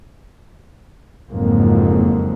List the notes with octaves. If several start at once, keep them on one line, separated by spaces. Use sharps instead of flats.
F#1 F2 G#2 F#3 A#3